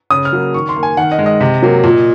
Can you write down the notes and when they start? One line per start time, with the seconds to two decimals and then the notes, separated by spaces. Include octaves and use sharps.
0.10 C#3 D#6
0.25 F6
0.33 F#3 A#3
0.54 D#3 C#6
0.69 C6
0.76 A#3
0.83 G#5
0.97 D#3 F#5
1.12 D#5
1.19 G#3
1.26 D#5
1.41 C3
1.63 F#3 A#3
1.84 A#2